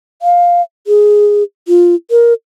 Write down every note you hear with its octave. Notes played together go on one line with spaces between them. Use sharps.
F5
G#4
F4
A#4